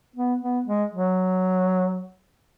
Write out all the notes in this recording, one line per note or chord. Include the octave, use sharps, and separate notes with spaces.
B3
B3
G#3
F#3